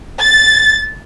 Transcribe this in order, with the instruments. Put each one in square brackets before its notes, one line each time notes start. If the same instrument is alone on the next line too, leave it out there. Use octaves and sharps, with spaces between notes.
[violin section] A6